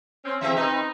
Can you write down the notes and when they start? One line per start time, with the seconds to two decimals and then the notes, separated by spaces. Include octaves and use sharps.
0.25 C4 C#4
0.41 E3 C4 G#4 E5
0.57 C4 D#4 B4